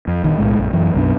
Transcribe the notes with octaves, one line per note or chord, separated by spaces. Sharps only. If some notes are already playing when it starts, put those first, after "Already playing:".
F2
A#1 D#3
B1 A2 G#3
A#1 F#2
F#2 E3
B1 F#2 B2 D4